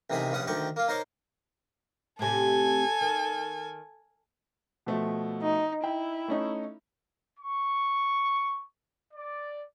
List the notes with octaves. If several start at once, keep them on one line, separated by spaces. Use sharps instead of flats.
A1 C3 D#3 G#4 G#5 B5
A#1 G2 C#4 F#5 D#6
D2 D3 D#3 G5 C#6
A#3 F4
D#4 A#4 C5 C#5 D6
A2 C3 A4 G#5
D#3
B2 F3 A3
D#4
E4 G5
A3 C#4 D#4
C#6
D5